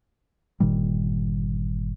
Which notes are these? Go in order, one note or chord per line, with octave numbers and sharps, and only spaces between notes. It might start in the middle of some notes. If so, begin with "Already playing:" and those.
G1 A#2 D#3 G3